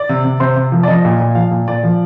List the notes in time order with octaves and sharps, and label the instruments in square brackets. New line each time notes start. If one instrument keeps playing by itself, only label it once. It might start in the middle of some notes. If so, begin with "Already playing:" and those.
Already playing: [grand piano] D5
C3
C3
C3 C5
C3
F3
D5
F3 D#5
A#2
A#2
F3 F5
A#2
A#2 D5
F3